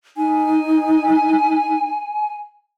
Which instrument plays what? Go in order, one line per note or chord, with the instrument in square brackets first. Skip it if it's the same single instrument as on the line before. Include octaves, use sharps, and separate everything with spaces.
[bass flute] D#4 [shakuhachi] G#5